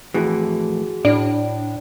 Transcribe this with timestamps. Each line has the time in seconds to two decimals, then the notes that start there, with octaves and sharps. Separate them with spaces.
0.14 F2 A2 E3 F#4 G#4
1.05 A2 D4 D5